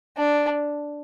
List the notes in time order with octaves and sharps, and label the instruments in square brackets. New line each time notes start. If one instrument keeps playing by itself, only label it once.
[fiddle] D4